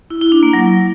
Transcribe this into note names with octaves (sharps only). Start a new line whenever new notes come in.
E4
E4
D4
A#3
F#3